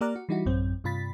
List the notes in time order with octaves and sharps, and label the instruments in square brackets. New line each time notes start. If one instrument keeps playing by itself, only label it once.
[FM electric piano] A#3 G4 D5 A#5 F6 F#6
F#4
E3 G3 D#4 E4 F#4
A1 F#2 C4
G2 C3 F4 B5 A6 B6